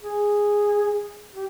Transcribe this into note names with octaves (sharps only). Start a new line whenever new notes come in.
G#4
G4